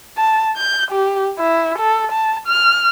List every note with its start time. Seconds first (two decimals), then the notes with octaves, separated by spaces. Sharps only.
0.18 A5
0.57 G6
0.91 G4
1.39 E4
1.79 A4
2.12 A5
2.47 F6